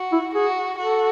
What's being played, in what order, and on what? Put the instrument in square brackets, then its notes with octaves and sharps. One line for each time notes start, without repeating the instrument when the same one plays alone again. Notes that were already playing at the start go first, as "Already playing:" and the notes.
Already playing: [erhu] F#4
[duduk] E4
[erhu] F#4 [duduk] G#4
[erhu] F#4 [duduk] A4